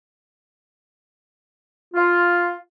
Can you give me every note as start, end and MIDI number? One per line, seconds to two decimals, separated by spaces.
1.94 2.53 65